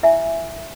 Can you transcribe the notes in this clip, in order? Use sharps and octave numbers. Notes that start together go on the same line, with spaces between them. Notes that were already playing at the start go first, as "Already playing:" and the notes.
E4 E5 G#5